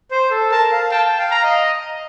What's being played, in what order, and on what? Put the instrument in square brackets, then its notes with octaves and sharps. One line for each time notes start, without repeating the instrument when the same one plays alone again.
[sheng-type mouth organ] C5
A4
[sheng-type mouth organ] A#4 [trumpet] A5
[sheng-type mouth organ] F5
[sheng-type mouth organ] G5 [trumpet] A5
[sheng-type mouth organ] F5
[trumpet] A#5
[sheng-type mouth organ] D#5